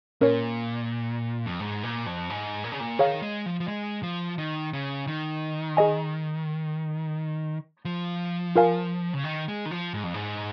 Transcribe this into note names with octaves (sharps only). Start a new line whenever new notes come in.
A#2 C#4 A#4 C#5
F2
G#2
A#2
F2
G#2
A#2
C#3
A#2
D#3 G#4 C#5 F5
G#3
F3
F3
G#3
F3
D#3
C#3
D#3
G#4 D#5 G#5
F3
F4 A#4 F5 G#5
C#3
D#3
G#3
D#3
F3
G#2
F2
G#2